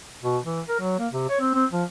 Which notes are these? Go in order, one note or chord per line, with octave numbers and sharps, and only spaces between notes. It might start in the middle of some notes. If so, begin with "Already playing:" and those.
B2
E3
A#4
F#3
A#3
C3
C#5
C4
C4
F3